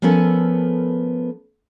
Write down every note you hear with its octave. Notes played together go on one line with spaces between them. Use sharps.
F3 A3 B3 C#4 A4 A#4